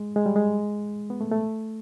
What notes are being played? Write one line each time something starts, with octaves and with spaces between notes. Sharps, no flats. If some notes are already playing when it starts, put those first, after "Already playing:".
Already playing: G#3
G#3
G3
G#3
B3
A3
A3